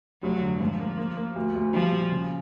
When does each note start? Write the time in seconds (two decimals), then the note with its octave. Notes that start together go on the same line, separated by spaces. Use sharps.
0.23 F1 F#3
0.41 D3
0.60 G#2 F3
0.80 A#3
0.98 A#3
1.17 A#3
1.36 D2
1.55 D2
1.73 F3 G3
1.92 A#2
2.12 C#3